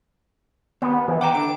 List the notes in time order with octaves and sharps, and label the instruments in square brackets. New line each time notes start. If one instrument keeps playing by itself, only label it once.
[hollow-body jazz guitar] D#2 [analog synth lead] B3
[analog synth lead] E3
[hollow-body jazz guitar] F#5 G5 A#5 [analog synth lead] D6
[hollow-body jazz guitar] D3 [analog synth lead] D7